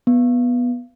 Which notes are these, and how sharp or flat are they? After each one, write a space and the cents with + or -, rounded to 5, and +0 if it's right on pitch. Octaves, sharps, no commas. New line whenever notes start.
B3 -10